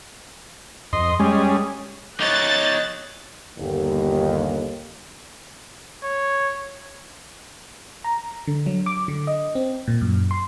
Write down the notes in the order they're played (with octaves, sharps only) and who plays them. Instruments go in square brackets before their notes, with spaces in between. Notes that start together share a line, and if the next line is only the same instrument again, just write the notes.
[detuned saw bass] F2 [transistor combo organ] D#5 C6
[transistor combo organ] G3 C#4 G#4 [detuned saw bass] G#3
[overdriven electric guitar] D#4 C#5 [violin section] F#6 A6
[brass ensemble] G1 D#2
[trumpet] C#5
[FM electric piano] A#5
D3
F#3
D6
D3
D#5
C4
A#2
F#2
C6